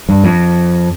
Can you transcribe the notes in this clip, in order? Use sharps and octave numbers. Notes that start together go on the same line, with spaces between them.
G2
F2